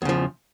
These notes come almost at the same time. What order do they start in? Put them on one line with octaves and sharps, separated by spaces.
E2 C#3 F3